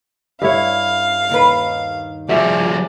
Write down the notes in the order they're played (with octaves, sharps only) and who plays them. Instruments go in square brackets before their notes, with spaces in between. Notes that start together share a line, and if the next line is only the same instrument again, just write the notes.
[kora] G2 E4 C#5 [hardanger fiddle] F5
[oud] D#2 D#3 B4
[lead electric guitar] F3 G3 [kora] F#4 E5 F#5 [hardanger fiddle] G#4 D5